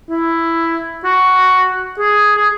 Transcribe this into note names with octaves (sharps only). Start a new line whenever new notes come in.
E4
F#4
G#4
G#4